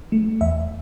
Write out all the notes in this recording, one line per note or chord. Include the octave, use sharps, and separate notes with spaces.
A3
E2 E5